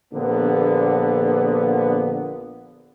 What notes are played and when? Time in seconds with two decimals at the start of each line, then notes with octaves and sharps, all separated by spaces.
0.12 A#1 D3 A#3 B3